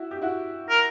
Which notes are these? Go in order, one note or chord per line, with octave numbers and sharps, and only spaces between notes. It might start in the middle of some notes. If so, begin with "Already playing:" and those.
Already playing: E4 F#4
G4
E4 F#4
A#4